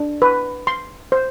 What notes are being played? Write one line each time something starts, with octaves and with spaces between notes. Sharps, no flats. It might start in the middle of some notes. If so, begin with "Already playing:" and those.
Already playing: D4
B4
C6
C5